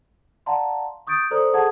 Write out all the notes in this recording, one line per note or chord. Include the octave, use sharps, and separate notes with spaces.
D5 F5 F#5 A5 A#5 C6
C#6 D#6 G6 A6 D7
A4 C5 D5 A#5 D#6
G#4 A4 F#5 A5 D#6 G#6